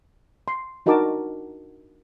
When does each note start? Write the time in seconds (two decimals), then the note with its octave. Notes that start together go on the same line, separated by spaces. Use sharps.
0.48 C6
0.86 D4 D#4 F#4 A#4 A5 D6